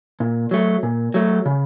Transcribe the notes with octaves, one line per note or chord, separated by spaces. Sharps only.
A#2
F#3 A3
A#2
F#3 A3
C#3